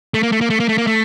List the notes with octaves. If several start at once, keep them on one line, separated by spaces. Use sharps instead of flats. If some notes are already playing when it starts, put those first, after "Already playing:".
A3
A#3
A3
A#3
A3
A#3
A3
A#3
A3